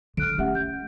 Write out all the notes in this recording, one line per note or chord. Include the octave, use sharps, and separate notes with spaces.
D3 F6 F#6 D7
A3 C#4 G4 E5 F#5
G6